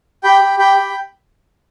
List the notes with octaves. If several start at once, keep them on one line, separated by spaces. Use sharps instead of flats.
G4 G5 B5
G4
G4 G5 B5
G4